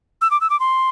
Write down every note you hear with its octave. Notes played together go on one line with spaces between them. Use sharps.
E6
D6
E6
D6
C6